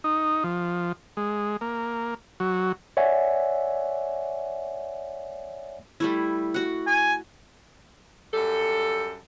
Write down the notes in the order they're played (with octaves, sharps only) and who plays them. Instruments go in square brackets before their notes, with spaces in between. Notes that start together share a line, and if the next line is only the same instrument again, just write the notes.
[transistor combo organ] D#4
F3
G#3
A#3
F#3
[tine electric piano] C#5 D5 E5 F#5 G#5
[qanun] G3 A3 E4
F#4 F#5
[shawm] G#5
[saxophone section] F#2 G3 A4